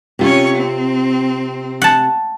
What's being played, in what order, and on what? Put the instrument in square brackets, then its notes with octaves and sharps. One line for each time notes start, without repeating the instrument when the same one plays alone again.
[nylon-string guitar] C3 F4 [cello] C#4 C#5
[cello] C4
[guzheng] F#5 A5